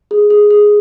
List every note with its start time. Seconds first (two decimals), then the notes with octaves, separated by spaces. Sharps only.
0.11 G#4
0.30 G#4
0.51 G#4